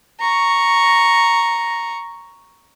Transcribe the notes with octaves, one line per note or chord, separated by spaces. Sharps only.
A#5 C#6